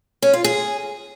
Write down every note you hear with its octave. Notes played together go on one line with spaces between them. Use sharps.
C#4
F4
G#4